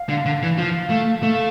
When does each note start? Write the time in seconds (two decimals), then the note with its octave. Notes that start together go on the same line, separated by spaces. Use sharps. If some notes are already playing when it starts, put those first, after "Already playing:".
Already playing: F5
0.09 D3
0.25 D3
0.42 E3
0.58 F3 F5
0.90 A3
1.23 A3 F5